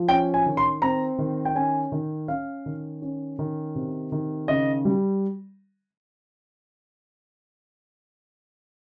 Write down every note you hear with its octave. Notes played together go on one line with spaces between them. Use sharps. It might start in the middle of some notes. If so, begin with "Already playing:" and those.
Already playing: F3
C#4 G5
G#5
D#3
C6
C4 A#5
D#3
G5
C#4 G#5
D#3
C#4 F5
D#3
C#4
D#3
C3
D#3
C#3 D#5
G3